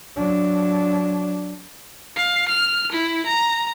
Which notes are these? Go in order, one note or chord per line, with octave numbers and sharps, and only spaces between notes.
F#3 D4
F5
F6
E4
A#5